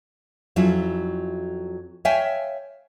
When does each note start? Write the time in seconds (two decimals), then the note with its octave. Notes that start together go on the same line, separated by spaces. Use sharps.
0.56 F2 F#3 C#4 E4 F4
2.05 C#5 E5 F5 G5 G#5